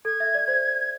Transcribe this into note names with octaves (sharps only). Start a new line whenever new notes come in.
A4 G#6
E5
D5
C5